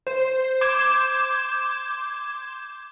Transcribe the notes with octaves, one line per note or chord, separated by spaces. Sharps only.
C5
C6 D6 G6 G#6 E7